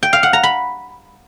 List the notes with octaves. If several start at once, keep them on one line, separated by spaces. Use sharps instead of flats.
G5
F5
F#5
A#5
B5